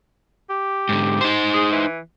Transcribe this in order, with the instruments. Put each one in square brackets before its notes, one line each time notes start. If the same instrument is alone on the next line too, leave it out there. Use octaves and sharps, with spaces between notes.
[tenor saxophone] G4
[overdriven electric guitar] G#2 D3
D#4 C5
[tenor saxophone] G#4
E3